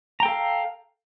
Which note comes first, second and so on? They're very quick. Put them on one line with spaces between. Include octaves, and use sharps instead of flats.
A#5 G5 A4 F5